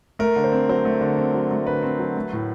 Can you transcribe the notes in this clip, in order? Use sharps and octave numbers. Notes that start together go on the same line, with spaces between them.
A3 A#4
D3
C5
C4
F#3 C5
A3
D3
C4
F#3
A3
D3 B4
C4
F#3
A3
A2